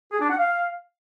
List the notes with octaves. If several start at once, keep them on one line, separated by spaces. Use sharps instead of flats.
G#4
D4
F#5
F5